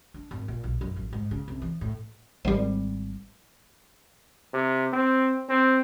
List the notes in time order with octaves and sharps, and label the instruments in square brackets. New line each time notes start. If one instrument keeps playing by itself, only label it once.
[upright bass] D4
G#1
A#2
B1
F#2
A1
G#2
C#3
C2
E3
A2
[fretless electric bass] G#1 G3
[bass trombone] C3
C4
C4